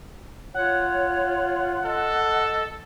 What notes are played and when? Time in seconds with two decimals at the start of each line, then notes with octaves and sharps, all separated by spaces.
0.54 F4 C#5 F#5
1.85 A4 D#5